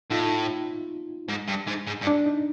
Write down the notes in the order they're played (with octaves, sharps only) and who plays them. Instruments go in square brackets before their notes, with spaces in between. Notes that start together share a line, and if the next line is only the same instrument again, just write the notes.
[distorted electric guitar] A2 [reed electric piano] D#4 F4
[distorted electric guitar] G#2
G2
G#2
G#2
G2
[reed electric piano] D4
D#4